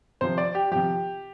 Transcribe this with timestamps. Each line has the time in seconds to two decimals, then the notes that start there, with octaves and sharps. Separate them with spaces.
0.21 C3 F3 C5
0.38 D5
0.55 G4
0.71 C3 F3 G4